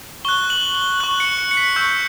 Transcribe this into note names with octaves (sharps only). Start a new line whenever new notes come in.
C#6 F#6 G7
F#7
G7
C#6 F#6 F#7
C#7
C#7
C#7
B6
C#6 E6 G6